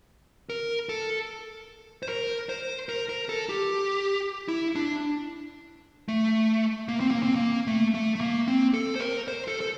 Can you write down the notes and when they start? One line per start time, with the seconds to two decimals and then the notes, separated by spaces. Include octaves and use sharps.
0.50 A#4
0.89 A4
2.03 C5
2.09 A#4
2.49 C5
2.89 A#4
3.09 A#4
3.29 A4
3.49 G4
4.48 E4
4.75 D4
6.08 A3
6.88 A#3
7.00 C4
7.11 A#3
7.23 C4
7.35 A#3
7.67 A3
7.94 A3
8.15 A3
8.21 A#3
8.48 C4
8.74 A4
8.95 C5
9.00 A#4
9.28 C5
9.48 A4
9.61 A4